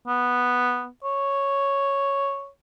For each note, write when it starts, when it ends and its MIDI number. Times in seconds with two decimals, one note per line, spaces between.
0.07 0.87 59
1.03 2.49 73